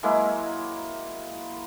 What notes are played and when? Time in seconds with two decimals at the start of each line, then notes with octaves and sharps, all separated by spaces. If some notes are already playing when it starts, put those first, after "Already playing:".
0.03 F#3 G#3 A#3 E4